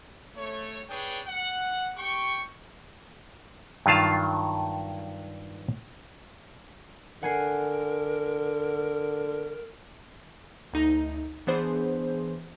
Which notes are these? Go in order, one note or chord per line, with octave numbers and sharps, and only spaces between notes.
A3 C#5
D4 G#4 B4 C#5 G5
F#5
G4 G5 C#6
G2 D#3 F#3 F4 F5 A5
D3 A#4 F#5 G#5 C7
D2 D#4
E3 B3 D4 G#4 C5